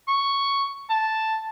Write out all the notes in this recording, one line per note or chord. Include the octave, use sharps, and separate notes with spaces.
C#6
A5